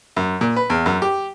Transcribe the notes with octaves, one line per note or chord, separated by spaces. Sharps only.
F#2
A#2
B4
E2
F#2
G4